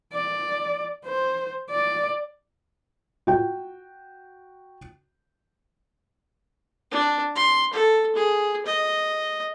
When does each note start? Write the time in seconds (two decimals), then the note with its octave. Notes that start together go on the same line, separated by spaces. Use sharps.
0.13 D5
1.06 C5
1.71 D5
3.27 F#4 G5
6.91 D4
7.36 C6
7.73 A4
8.15 G#4
8.66 D#5